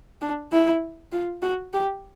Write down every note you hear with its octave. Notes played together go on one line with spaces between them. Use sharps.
D4
E4
F4
F#4
G4